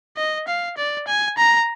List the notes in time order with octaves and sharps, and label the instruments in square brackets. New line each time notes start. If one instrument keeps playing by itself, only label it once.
[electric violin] D#5
F5
D5
G#5
A#5